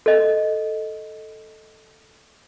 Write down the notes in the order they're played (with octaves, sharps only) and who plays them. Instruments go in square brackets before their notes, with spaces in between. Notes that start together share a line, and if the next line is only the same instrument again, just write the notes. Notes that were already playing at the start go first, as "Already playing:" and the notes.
[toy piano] A4 D#5